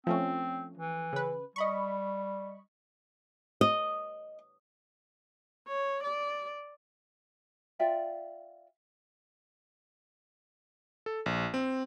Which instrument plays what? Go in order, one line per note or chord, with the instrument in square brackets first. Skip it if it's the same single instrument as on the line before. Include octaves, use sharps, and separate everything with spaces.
[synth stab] F3 A3 C#4 [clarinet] C4
[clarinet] E3
[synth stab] C#3 B4
[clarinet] G3 [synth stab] D#5 B5 C#6
[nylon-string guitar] D#5
[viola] C#5
D5
[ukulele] F4 D5 E5 G5
[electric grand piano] A4
A#1
C4